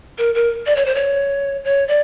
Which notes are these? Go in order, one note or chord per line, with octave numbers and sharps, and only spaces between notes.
A#4
A#4
D5
C#5
C5
C#5
C#5
D5